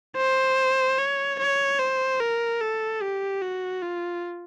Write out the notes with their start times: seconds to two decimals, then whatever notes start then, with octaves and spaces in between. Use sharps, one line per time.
0.17 C5
0.98 C#5
1.39 C#5
1.79 C5
2.20 A#4
2.61 A4
3.02 G4
3.42 F#4
3.82 F4